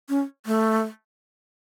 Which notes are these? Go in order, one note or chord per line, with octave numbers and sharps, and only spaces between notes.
C#4
A3